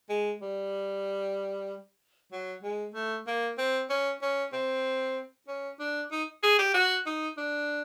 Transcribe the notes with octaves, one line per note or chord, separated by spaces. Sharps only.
G#3
G3
F#3
G#3
A3
A#3
C4
C#4
C#4
C4
C#4
D4
D#4
G#4
G4
F#4
D#4
D4